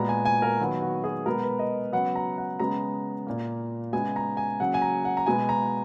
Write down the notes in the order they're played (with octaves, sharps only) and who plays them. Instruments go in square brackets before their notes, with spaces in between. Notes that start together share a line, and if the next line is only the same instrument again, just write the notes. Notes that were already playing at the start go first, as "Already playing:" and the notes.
Already playing: [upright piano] A#2 G#3 B3 A#5
G#5
G#5
A#4
D#3 F#3 B3
F#4
G#4
B2 G#3 B3 A#4
B4
D#5
C#3 F#3 B3 F#5
A#5
F#5
C#3 G#3 B3 A#5
A#2 A#3
C#3 G#3 B3 G#5
A#5
G#5
C#3 F#3 A#3 F#5
G#5
A#5
F#5
A#5
B2 G#3 B3 G#5
A#5